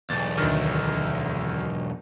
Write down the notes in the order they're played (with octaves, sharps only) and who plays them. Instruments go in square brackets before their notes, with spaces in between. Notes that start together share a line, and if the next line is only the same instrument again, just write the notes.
[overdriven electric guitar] B1 E2 [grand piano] A6
[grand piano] D2 D#3